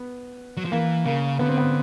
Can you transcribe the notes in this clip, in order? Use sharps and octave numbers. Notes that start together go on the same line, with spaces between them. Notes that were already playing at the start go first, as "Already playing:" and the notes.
Already playing: B3
F#3
F3
E3 A#3
C#3 A#3
D3 B3
C4
B3